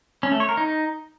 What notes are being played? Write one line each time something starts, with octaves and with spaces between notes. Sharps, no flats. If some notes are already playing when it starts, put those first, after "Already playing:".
C#4
A3
C#5
A#4
D#4